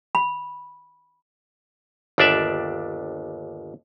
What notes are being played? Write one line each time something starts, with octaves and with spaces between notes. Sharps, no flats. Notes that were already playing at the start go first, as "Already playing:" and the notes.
B5
G1 D#2 D4 D5 E5